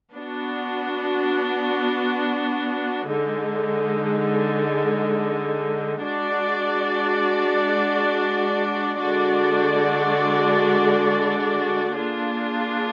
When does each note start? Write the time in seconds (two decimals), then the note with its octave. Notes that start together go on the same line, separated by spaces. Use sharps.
0.14 B3 D4 F#4
3.08 D3 G#3 D#4
6.03 G#3 D4 F#4 D5
8.98 D3 G#3 D4 F#4 D5
11.93 A#3 D4 F4 G#4